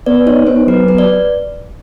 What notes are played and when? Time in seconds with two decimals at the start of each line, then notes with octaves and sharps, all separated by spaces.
0.06 B3 D5
0.26 D#4 C#5
0.47 B3 C5
0.67 F#3 B4
0.88 B3 B4
0.98 D5